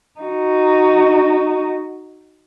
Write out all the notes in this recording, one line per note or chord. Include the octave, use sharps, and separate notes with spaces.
D#4 F#4